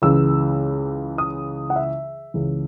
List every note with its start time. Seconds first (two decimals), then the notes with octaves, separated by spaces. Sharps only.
0.02 C#2 C#3 E3 E6
1.18 D#6
1.70 F#5
1.76 E5
2.34 C#2 C#3 E3